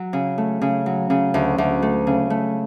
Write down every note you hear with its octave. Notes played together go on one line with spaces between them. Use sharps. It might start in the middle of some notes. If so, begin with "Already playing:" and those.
Already playing: F#3
C#3
A3
C#3
F#3
C#3
D2
D2
A3
C#3
A3